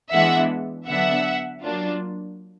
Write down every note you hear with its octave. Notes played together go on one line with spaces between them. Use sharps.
E3 G#3 B3 D4 E5 F#5
D3 F#3 B3 D4 E5 F#5
F#3 A#3 D4 F4